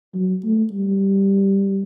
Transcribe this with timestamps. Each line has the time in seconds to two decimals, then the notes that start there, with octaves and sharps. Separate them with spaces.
0.15 F#3
0.44 A3
0.72 G3